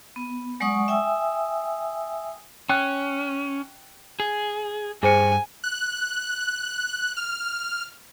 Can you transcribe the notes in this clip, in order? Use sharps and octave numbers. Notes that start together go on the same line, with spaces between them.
B3
F#3 G#3 D5 F#5 C#6 D#6
E5 G5 G#5 D#6 E6
C#4 G5 F#6
G#4
G2 G#4 C5 G#5 C#7
F#6
F6